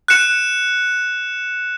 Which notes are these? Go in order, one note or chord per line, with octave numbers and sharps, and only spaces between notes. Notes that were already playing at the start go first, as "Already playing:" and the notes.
F#6 C#7 E7